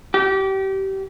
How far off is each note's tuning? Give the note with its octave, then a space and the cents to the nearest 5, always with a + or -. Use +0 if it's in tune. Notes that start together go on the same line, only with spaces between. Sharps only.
G4 -25